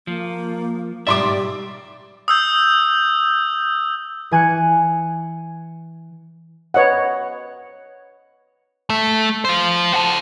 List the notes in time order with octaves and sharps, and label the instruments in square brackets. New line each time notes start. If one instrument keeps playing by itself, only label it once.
[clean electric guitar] F3 [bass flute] A#3
[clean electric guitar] B1 G#2 E5 [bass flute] G3 [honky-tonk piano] D5 C6 D6
[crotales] D#6 E6 G6
[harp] E3 G#5 F#6 C#7
[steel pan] B4 C#5 D#5 F#5
[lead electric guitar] A3
F4 C5
F#4 A4